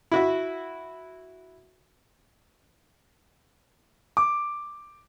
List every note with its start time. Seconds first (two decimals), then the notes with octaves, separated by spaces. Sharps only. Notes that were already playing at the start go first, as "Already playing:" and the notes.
0.11 E4 F#4 E5
4.17 D6